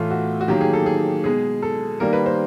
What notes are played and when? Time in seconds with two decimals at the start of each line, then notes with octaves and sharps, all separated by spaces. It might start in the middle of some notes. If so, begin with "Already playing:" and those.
Already playing: A2 E3 A3 F4
0.10 F#4
0.41 F#4
0.48 D#3 F#3 A#3 G4
0.61 G#4
0.73 A4
0.86 G#4
1.24 B2 G#3 G#4
1.62 A4
2.00 D#3 G3 A#3 A#4
2.13 B4
2.26 C5